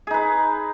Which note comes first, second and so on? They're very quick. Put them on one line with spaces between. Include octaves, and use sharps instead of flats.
G#4 D#4 B4